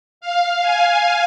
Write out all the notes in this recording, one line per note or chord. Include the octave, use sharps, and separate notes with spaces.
F5
G#5